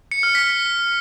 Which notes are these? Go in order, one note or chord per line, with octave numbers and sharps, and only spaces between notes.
C#7
F6
B6